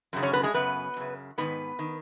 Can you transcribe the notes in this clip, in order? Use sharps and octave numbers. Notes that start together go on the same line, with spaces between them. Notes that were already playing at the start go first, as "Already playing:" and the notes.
F#2 C#3
C#4 C#5
B3 B4
G#3 G#4
F#2 C#3 B3 B4
F#2 C#3
G#2 D#3 B3 B4
D#3